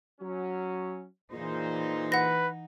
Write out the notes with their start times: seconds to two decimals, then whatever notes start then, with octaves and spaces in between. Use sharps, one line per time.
0.21 F#3 C#4
1.32 A#2 E3 D#4 G#4 C5
2.12 B4 F#5 A#6